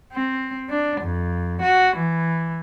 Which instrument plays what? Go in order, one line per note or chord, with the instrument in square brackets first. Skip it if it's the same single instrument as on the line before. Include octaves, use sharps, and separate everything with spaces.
[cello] C4
D4
F2
F#4
E3